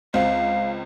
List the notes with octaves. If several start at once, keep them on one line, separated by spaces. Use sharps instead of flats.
C#2 C4 F5